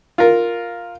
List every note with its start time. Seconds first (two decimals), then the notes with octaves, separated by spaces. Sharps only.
0.18 F4 A#4